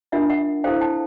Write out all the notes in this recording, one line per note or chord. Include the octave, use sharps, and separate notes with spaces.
D4 F4 A#4 E5 F#5
E5 F#5
E4 A4 C5 F5 G5
G5 A5